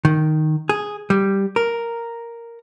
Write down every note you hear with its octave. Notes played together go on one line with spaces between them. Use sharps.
D#3
G#4
G3
A#4